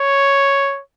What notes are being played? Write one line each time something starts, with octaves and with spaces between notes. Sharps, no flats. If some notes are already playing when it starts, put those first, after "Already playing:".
Already playing: C#5